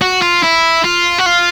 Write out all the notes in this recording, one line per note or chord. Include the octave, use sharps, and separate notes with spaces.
F#4
F4
E4
F4
F#4
F4